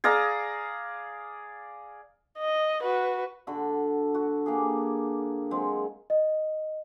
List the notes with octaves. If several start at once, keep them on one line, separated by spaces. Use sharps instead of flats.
G#4 D5 F5 A#5
D#5
F#4 B4
D3 F#4 A4 B5
F#4
A#3 G4 G#4
F#3 G#3 C4
D#5